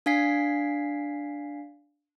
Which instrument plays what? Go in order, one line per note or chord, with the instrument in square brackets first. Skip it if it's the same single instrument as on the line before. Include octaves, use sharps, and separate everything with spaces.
[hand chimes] D4 F5 G#5 B6 C7